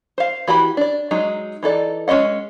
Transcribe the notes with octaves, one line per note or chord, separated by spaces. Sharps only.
C5 F5
E3 F#4 G4 B5
D4 D5
F#3 G#3 D#4
E3 D#4 A4 D5
G#3 C#4 E4 D#5 F#5